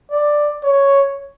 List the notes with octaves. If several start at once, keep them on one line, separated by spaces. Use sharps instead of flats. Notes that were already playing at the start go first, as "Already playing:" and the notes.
D5
C#5